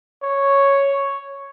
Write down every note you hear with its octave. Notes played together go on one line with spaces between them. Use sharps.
C#5